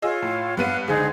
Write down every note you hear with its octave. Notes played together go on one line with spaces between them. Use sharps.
F4 G#4 C#5 D#5 E6
A2
G2 B3 F5 F#5 F#6 D#7
C#2 D3 D#4 G#4 C5